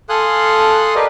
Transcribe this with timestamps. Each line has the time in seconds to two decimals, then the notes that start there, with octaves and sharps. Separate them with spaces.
0.09 A4 F5 G#5 C6 D#6 F#6
0.95 G4 A#4 B4 D5 D#5 F5